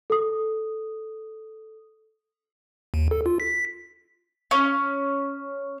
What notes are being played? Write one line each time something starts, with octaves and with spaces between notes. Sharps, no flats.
A4 D#6
D#2
A4
F4
B6
C#4